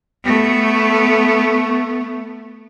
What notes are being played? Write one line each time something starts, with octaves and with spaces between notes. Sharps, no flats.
A3 B3